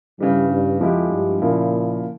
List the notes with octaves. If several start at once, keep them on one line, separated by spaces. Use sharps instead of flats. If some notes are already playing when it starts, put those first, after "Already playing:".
G2 C#3 E3 G3
G2
F2 F3 G#3 E4 G4
G2
A#2 C#3 F3 A#3 E4